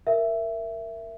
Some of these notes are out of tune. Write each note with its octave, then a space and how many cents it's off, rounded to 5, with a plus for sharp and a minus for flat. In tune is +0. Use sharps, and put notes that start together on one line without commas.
A#4 -5 E5 +10